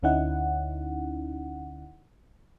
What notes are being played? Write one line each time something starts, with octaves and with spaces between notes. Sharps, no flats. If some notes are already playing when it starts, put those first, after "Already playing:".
D2 D3 C#4 D#4 E4 F#5